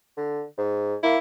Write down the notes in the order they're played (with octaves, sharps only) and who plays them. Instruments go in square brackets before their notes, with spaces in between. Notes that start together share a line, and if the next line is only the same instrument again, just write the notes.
[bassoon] D3
G#2
[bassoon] A#3 [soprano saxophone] E4